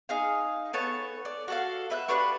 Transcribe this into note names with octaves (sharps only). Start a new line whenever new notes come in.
D#4 G#4 F5
B3 A4 C#5
D5
F#4 A4 F5
B4 E5 F#6
D4 G4 B4 C#6